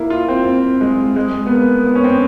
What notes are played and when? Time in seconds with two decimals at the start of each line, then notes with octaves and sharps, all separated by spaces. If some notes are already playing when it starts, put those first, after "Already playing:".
Already playing: A#3 E4
0.10 F4
0.28 C4
0.45 C4
0.81 G#3
1.16 G#3
1.47 B3
1.51 A#3
1.87 B3
1.95 C#4
2.04 C4